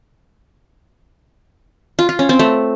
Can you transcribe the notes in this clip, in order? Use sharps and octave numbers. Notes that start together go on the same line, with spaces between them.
F4
F4
C#4
C4
A3